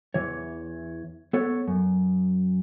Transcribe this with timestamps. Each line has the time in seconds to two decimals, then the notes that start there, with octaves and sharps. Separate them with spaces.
0.14 E2 E3 C#5
1.33 B3 A4 C#5
1.68 F#2